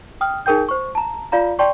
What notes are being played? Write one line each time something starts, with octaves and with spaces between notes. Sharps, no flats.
G5 D#6 F6
D#4 G#4 A#4 G5 G6
C5 C#6
A5 A#5
F4 D5 F5 A#5
D5 G5 A5 C6 C#6